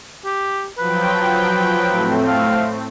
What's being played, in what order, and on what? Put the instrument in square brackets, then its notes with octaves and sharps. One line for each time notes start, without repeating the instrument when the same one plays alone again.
[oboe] G4
[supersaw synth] F3 F#3 G5 [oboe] B4
[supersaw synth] A2 A3 C4
[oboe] F5